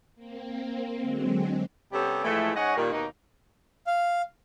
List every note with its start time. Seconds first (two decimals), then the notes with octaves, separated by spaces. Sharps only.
0.15 A#3 C4
0.99 D3 F#3 G#3 C4
1.92 C3 G3 B3 C#4 G4 A4
2.24 A2 E3 F3 G#3 A3
2.55 G#2 C#4 C#5 D#5 F#5
2.76 A#2 D#3 G3
2.92 D#2 B2 A#3 D#4
3.87 F5